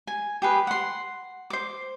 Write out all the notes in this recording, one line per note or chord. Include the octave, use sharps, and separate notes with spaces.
G#5
G4 G#4 B4
F#5 C6
C5 D6